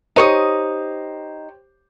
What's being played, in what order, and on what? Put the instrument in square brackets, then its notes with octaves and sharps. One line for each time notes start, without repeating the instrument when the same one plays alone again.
[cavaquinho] D#4 C#6 D#6 [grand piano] G4 C5 C#5